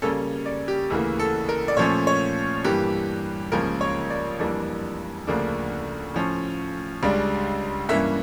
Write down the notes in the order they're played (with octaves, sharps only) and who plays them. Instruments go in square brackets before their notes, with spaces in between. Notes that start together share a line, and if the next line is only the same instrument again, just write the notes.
[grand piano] C#3 G3 A#3 C#4 A4
D5
G4
D2 C#3 E3 A#3
A4
A#4
D5
A#2 F3 A3 C#4 C#5
C#5
G2 E3 A#3 G4
C#2 C#3 F3 A#3 C#4 A#4
C#5
D5
F2 E3 G3 A#3 D4
D2 C#3 F3 A#3 D4
A2 F3 C#4
C#2 C#3 G3 D4
G2 E3 A#3 C#4 E5